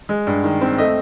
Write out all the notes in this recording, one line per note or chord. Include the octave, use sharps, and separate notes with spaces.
G#3
G2
D#3
C4
A3 D#5